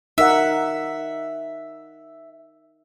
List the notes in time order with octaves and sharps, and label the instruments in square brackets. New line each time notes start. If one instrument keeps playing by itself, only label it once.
[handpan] D#4 A#4 F#5 [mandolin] E5